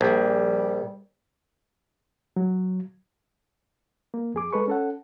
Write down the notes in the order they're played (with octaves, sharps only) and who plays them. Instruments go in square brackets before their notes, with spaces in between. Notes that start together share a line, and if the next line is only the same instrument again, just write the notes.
[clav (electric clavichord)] A#1 [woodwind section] G3
[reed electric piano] F#3
A#3
F2 G#4 D6
G#3 A4 B4 C#6
C#4 A4 F#5